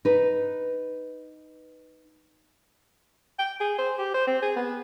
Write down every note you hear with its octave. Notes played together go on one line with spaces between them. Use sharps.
D#4 B4
G5
G#4
C5
G4
C5
C4
G#4
B3